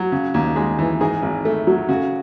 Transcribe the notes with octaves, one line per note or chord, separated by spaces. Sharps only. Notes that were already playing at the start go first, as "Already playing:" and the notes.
Already playing: F#3
C#3
D#2
G#3
E3
G#2 G#4
G#1
A3
F#3
C#3 F#4